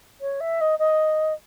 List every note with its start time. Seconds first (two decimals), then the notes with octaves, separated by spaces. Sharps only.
0.21 C#5
0.40 E5
0.61 D#5
0.79 D#5